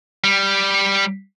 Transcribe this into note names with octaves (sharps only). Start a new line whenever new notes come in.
G3